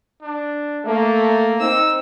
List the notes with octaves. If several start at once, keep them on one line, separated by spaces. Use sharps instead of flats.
D4
A3 A#3
C4 D#4 E6